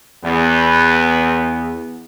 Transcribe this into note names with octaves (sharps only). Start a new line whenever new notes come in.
E2 B3